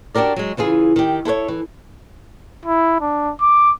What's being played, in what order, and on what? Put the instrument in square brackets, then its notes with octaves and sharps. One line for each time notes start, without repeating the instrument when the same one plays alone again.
[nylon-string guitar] D4 F#4 G4 A#4 D5
F#3 G#3
C#3 E3 F4 G#4
D#3 G4
E4 A4 B4 C#5
E3
[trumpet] E4
D4
D6